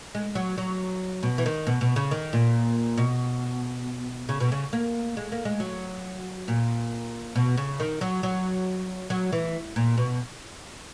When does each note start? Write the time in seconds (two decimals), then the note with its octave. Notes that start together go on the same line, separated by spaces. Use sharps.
0.15 G#3
0.35 F#3
0.58 F#3
1.23 B2
1.38 E3
1.46 D#3
1.67 B2
1.81 B2
1.96 C#3
2.11 D#3
2.33 A#2
2.98 B2
4.29 C#3
4.40 B2
4.52 C#3
4.73 A#3
5.17 G#3
5.32 A#3
5.45 G#3
5.60 F#3
6.48 A#2
7.36 B2
7.57 C#3
7.80 D#3
8.01 F#3
8.23 F#3
9.10 F#3
9.32 E3
9.76 A#2
9.98 B2